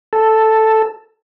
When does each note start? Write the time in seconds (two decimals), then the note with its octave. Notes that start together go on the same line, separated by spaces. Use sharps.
0.13 A4